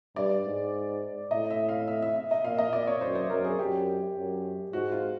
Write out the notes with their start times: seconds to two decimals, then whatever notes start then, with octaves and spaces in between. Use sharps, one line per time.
0.16 G2 D5
0.46 G#2
1.31 A2 D#5
1.50 E5
1.69 F5
1.88 E5
2.02 E5
2.16 E5
2.31 D#5
2.44 A#2 F5
2.54 E5
2.58 D#5
2.73 A#2 D5
2.87 C#5
3.01 F#2 C5
3.15 C5
3.30 F#2 A#4
3.44 G#4
3.59 F#2 G4
4.16 F#2
4.73 G#2 F#4
4.92 F4